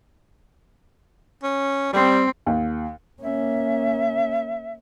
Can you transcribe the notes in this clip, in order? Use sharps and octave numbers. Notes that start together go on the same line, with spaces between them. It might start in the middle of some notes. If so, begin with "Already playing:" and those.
C#4
G3 C4
D#2
A#3 C#4 E5